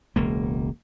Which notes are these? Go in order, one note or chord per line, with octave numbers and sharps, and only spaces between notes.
E1 C#2 A#3